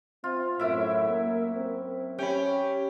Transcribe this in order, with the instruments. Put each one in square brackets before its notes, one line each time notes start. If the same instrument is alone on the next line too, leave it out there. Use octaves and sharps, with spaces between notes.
[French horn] C4 [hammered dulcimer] F4
[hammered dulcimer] F#2 E4 E5 [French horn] A2
[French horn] A#3
C4
[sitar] C#4 [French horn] G4 [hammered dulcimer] G5 B5